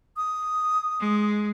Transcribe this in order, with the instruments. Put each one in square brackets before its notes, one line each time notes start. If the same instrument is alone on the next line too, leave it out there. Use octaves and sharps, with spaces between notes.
[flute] D#6
[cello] G#3